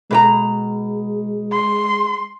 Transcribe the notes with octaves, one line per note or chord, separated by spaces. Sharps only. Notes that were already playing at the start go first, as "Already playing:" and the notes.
B2 G#3 B4 A#5
C6